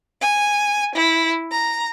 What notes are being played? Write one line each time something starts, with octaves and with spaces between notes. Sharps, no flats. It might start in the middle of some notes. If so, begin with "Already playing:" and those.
G#5
E4
A#5